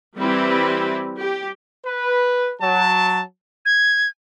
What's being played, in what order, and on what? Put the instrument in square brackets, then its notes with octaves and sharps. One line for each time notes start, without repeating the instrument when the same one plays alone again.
[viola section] E3 G3 C4 E4 G4 B4
G4
[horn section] B4
F#3 A5
[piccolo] G#6